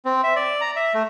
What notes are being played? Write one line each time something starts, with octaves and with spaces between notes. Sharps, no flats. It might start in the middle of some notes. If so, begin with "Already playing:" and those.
C4
E5
D5
A#5
E5
A3